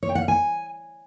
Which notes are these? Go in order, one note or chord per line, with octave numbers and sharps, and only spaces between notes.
C#5
G5
F#5
F5
G#5